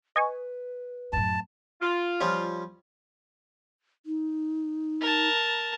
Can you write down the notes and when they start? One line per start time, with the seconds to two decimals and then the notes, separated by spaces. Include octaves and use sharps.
0.16 B4 D#5 G#5 C#6
1.13 F#2 A2 A5
1.81 F4
2.21 F3 G3 C#4
4.06 D#4
5.01 A#4 A5